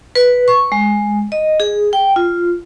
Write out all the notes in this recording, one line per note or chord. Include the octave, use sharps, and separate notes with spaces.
B4
C#6
G#3
D#5
G#4
G5
F4